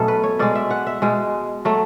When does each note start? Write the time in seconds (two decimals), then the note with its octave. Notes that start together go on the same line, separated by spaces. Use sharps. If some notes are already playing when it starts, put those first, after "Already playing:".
Already playing: B2 F#3 A3 B3 C#4 A4
0.08 B4
0.24 C#5
0.39 B2 G#3 D5
0.55 E5
0.71 F#5
0.87 E5
1.02 B2 G#3
1.65 F#3 A3